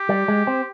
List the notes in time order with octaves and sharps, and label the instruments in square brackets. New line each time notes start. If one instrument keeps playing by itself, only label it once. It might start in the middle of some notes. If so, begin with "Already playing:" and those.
Already playing: [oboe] G4
[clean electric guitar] G3
G#3
C4